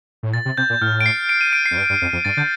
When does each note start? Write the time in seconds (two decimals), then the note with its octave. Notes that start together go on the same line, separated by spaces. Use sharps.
0.23 A2
0.34 A#2 A6
0.45 C3
0.58 C3 G6
0.70 A#2
0.81 A2 F6
1.01 D7
1.06 C7
1.29 D7
1.41 D#7
1.53 D7
1.66 C7
1.71 F2
1.77 G2
1.90 G2
2.02 F2
2.13 F2
2.25 G2 A6
2.37 D3 G6